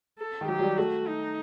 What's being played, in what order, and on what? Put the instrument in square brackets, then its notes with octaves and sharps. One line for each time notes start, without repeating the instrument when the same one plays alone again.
[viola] A4
[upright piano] D#3
[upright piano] F#3 [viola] G4
[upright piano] F#3
G3
[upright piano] A3 [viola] F#4
[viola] D#4